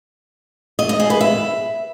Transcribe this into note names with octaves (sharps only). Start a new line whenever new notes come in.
D#5
D#5
G#4
B4
E5